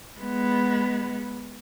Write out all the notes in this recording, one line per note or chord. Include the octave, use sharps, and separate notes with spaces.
G#3 B3